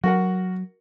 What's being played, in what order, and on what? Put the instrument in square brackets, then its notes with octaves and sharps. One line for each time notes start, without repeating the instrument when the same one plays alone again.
[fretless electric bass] F#3 [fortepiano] F#4 A#4 F#5